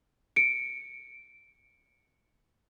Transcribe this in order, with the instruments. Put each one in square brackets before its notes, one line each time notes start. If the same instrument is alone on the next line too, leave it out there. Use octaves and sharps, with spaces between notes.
[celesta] C#7 D7